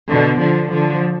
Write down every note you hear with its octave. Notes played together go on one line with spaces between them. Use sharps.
B2 D3
D3 F3
D3 F3